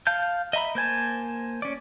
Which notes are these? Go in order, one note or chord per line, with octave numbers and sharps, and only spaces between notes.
F5 A5 G6
D#5 E5 A#5 B5
A#3 C5 G#5 A5
C#4 D5